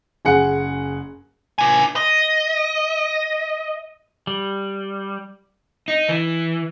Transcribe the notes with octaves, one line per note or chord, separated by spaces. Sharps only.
F#1 G#4 F#5 C#7
D4 G#5
D#5
G3
D#4
E3